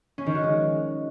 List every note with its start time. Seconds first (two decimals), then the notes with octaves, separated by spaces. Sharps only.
0.18 C#4
0.26 D#3
0.35 F#4
0.43 G#3